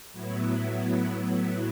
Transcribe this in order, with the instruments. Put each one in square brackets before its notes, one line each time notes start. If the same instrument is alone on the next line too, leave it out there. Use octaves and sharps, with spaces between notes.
[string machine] A2 F#3 B3 E4